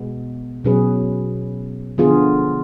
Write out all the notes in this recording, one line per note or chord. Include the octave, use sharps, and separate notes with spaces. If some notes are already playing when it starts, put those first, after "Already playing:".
Already playing: B2 G#3 B3
B2 F#3 C#4 G#4 B4
D3 F3 B3 F4 G#4